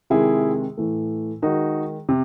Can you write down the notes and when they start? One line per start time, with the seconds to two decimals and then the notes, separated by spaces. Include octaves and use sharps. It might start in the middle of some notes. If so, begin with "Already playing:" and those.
0.10 C3 D#3 G#3 E4 G#4
0.77 A2 E3 A3
1.42 D#3 G#3 D#4 F#4
2.09 C3